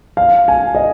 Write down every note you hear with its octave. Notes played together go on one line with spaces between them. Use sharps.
F5
G#5
D#5